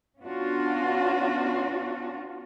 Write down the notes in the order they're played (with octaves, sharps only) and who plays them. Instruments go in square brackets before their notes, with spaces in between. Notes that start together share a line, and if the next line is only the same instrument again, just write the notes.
[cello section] B3 C#4 D4 F4 F#4